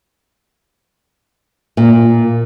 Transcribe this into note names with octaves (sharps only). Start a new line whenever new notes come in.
A#2